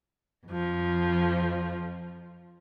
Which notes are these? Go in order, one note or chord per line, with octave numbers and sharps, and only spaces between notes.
F2 F3